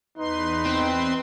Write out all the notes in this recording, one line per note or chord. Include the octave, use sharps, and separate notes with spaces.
E2 D#4 B4 C6
C4